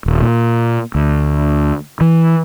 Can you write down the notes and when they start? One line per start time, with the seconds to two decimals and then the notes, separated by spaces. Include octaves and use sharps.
0.06 D#1
0.22 A#2
0.95 D2
2.01 E3